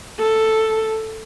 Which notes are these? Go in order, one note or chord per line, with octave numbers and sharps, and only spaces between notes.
A4